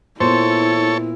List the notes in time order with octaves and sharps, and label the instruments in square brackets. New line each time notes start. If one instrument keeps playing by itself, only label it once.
[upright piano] A#2 B3 [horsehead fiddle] E4 [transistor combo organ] A4 C#5 [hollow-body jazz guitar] C5